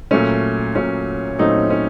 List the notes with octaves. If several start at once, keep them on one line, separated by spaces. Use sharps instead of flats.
A#2 F#3 A3 C#4
A#2 F#3 A3 C#4
A#2 F#3 A3 C4 D#4
C#4